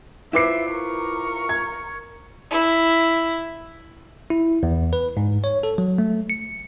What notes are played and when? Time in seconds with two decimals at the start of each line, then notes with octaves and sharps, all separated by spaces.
0.33 E4 F4 B4 C5 E5 D6 C7
0.72 A#4 C#6
1.49 G#6
2.50 E4
4.30 E4
4.63 E2
4.93 B4
5.17 G#2
5.44 C#5
5.63 A4
5.78 F#3
5.98 A3
6.30 C#7